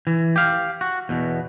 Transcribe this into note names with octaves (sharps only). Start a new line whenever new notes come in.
E3
G4 F5
F#4
E2 B2